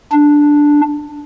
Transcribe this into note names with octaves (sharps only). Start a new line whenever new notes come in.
D4